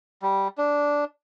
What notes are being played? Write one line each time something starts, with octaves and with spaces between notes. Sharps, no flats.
G3
D4